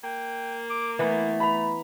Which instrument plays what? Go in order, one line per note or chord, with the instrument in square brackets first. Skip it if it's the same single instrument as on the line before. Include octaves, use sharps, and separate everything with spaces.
[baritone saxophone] A#3 [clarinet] G5
[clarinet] D6
[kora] E3 B3 F#5 [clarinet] A3
[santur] A#5 B5